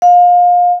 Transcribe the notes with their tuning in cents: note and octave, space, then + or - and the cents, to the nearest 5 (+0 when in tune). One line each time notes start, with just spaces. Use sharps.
F5 +25